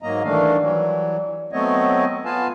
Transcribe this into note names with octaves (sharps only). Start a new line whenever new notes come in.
G#2 F#3 A#3 D#5 A#5
D#3 E3 G3 A3 D4 F5
E3 F#3 G3
F#3 A3 B3 C4 C#5 D#5
B3 F4 B4 F5 G#5 A5